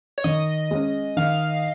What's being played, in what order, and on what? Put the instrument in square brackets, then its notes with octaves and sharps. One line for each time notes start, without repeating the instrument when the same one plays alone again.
[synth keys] C#5
[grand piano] D#3 [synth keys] D#5
[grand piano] G#3 C#4
[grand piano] D#3 [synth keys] F5